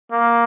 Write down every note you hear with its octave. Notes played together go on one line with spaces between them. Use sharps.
A#3